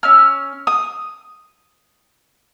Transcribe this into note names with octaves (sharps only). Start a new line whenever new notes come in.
C#4 E6 F6
D#6